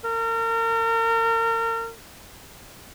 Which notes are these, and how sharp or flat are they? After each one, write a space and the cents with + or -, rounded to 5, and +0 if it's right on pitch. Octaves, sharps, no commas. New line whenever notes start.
A#4 -35